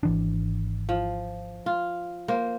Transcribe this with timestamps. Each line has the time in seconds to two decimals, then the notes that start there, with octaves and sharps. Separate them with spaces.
0.03 G#1 E3 D4
0.89 F3
1.66 F4
2.28 A#3 C5